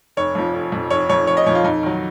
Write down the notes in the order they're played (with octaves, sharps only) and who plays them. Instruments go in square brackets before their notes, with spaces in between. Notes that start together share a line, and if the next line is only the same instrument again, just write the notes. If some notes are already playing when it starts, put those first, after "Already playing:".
[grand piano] F1 C#5
F2 F3
F1
F2 F3
F1 C#5
F2 F3 C#5
F1 C#5
D#5
F2 F3 C#5
F4
F2 D#4
D#3 F#3